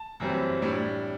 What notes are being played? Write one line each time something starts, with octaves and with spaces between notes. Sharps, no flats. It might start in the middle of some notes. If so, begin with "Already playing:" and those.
Already playing: A5
F#2 E3 G3 C4
A2 G3 D4